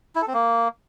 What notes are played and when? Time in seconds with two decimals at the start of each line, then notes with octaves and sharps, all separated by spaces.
0.16 E4
0.22 A4
0.28 C4
0.34 A#3